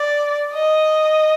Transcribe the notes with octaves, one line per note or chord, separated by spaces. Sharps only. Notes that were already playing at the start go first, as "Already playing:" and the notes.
Already playing: D5
D#5